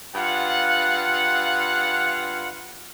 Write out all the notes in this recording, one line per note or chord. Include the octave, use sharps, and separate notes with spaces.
G2 F4 F5 F#5